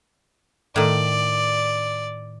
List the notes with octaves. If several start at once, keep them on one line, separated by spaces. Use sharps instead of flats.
A2 D#3 D5